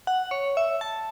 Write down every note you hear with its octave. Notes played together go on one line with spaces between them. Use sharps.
F#5
C#5
E5
A5